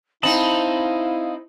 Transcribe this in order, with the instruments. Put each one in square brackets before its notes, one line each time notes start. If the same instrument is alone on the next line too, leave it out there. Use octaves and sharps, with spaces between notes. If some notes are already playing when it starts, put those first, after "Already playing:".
[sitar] C4 D#4 [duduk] E4 [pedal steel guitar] D#5 A5 B5 [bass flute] F5